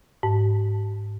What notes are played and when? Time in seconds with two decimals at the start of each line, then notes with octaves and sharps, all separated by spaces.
0.23 G#2